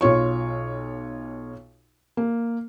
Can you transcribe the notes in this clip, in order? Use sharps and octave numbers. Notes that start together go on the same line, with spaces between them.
B1 F4 C#5 C#6
A#3